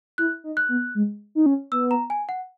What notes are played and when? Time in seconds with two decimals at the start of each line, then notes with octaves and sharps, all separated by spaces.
0.18 E4 F#6
0.44 D#4
0.57 F#6
0.69 B3
0.95 G#3
1.35 D#4
1.46 C#4
1.71 B3 E6
1.91 A#5
2.10 G#5
2.29 F#5